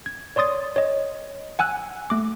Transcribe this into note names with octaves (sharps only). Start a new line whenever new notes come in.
G#6
C#5 D5 C6 D#6 A6
C#5 D#5
F#5 G#5 E6 F#6
A3 D6